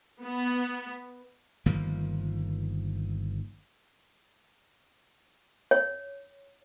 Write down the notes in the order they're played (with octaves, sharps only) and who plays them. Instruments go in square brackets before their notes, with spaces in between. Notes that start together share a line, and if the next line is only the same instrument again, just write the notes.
[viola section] B3
[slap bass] G1 D#3 F3 A#3
[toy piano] C#5